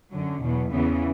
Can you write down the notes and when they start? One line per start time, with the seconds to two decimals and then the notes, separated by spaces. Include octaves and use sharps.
0.13 F#2 D3 F#3
0.42 E2 B2 F#3
0.71 E2 C#3 E3 B3